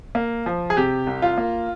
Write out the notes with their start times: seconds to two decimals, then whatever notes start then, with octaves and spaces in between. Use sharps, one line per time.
0.15 A#3
0.46 F3
0.70 G#4
0.77 C3 G4
1.07 C2
1.22 F4
1.38 A#3